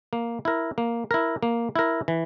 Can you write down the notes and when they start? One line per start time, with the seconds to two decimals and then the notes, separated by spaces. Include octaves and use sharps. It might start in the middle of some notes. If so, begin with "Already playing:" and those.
0.13 A#3
0.45 E4 A#4
0.78 A#3
1.11 E4 A#4
1.43 A#3
1.76 E4 A#4
2.08 E3